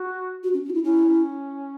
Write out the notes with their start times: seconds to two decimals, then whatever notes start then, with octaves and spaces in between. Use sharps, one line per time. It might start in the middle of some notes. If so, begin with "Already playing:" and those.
Already playing: F#4
0.43 F#4
0.53 C#4
0.65 C#4
0.69 F#4
0.74 E4
0.84 C#4 E4
1.06 C#4